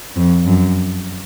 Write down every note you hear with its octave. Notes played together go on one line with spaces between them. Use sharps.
F2
F#2